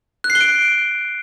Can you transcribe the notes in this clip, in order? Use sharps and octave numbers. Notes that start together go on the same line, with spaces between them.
F#6
C7
G7
D7